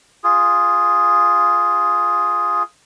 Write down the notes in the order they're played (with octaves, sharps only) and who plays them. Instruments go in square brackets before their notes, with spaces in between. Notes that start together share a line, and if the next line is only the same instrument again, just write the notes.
[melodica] F4 G#4